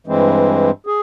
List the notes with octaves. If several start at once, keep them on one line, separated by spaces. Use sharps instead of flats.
G2 E3 G#3 C4
G#4